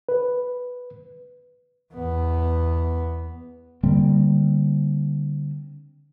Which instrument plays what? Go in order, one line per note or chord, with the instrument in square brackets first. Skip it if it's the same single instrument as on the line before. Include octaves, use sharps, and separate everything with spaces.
[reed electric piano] B4
[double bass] E2 B3
[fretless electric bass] D3 G3 A#3 C4